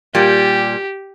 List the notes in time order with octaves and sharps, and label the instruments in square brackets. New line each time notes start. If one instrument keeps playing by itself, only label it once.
[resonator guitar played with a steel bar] A#2 G3 [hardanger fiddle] G4